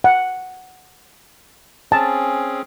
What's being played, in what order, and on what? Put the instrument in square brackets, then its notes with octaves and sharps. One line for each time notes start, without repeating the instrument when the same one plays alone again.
[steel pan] F#5
[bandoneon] C4 C#4 G#4 [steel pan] A5